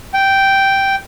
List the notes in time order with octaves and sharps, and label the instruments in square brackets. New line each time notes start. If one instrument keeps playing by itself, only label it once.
[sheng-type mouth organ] G5